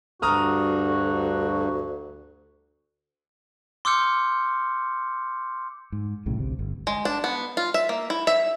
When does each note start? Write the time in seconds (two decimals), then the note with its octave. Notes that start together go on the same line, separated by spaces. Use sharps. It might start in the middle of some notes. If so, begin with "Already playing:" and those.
0.22 D2 G2 F#4 A#5 D#6 F6
3.85 C6 D6 E6 F6 G6 C#7
5.92 G#2
6.26 B1 A2 C#3
6.39 A1 D2 C3
6.59 G1
6.87 G#3
7.05 D4
7.24 B3
7.57 F4
7.74 E5
7.89 A#3
8.10 E4
8.27 E5